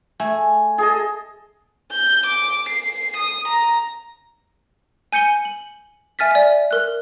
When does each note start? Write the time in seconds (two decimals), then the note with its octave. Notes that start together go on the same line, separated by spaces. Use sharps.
0.20 A3 G#5
0.78 G#4 A4 D#5
1.92 G6
2.26 D6
2.69 C7
3.17 D#6
3.48 A#5
5.13 G#5 G6 C#7 D#7 G7
5.45 F#7
6.19 E5 G#5 F6 A6 B6
6.31 D5 E5
6.71 A#4 F#6